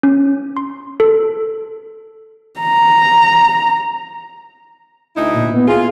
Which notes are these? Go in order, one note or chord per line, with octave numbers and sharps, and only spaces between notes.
C#4
C6
A4
A#5
D2 D#4 E4
A#2
B3
F4 G#4